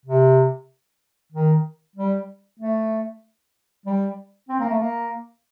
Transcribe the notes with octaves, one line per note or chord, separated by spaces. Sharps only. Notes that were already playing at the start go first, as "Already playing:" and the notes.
C3
D#3
G3
A3
G3
C4
A#3
A3
A#3